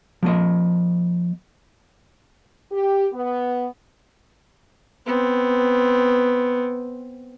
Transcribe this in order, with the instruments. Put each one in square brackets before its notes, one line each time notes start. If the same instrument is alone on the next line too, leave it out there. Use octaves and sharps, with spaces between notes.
[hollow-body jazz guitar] F3 A#3 D#5
[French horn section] G4
B3
[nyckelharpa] B3 C4